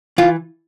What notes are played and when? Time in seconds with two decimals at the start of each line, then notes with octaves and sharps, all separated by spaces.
0.18 E3 F4